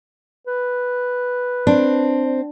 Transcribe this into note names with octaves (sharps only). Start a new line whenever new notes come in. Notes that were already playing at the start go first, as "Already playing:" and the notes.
B4
C4 D4